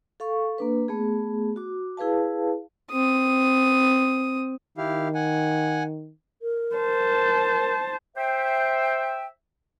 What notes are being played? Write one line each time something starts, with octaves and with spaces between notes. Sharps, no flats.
A4 F5 C#6
A#3 D4 B4
A3 B3 G#4
F#4 D6
E4 G#4 B4 F5 A5
C4 D#6
D#3 E4 G4 F5
F#5 G#5
A#4
C5 A5
C5 E5 G5